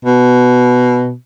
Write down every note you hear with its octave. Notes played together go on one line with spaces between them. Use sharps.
B2